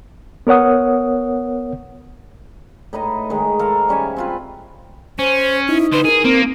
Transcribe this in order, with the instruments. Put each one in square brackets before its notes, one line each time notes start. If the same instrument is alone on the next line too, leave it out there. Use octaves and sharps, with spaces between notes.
[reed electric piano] B3 A#4 C#5 F#5 D#6
[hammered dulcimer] A2 D#4 B4 D#5
D#3 G#3
A4 A#4 C5 F5
G3 C#4 E5 G#5
C4 F4 B4
[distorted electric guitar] C#4 [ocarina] C5
[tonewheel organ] D#4 [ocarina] E4
[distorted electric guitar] D2 C5 [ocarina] B4
[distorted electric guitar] G#4 [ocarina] A#4
[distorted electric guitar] A#3 [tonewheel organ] C4